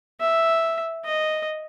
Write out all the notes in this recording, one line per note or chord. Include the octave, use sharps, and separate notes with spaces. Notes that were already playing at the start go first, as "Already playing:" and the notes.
E5
D#5